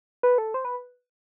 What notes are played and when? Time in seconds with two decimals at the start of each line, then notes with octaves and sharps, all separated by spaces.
0.23 B4
0.38 A4
0.54 C5
0.65 B4